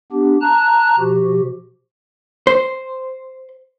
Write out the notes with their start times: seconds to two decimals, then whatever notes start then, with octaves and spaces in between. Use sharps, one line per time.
0.12 B3 D4 G4
0.41 A5 A#5 F#6
0.99 B2 F3 F#4 G4
2.47 C5